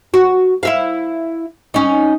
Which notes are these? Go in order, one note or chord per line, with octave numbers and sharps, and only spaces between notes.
F#4
E4 E5 F5
C#4 D#4